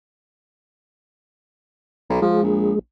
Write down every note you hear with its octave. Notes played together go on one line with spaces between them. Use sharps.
B1
F3 G#3 G#4
A#1